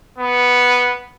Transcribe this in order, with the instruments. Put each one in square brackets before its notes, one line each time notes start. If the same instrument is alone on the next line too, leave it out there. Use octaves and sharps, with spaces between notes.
[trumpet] B3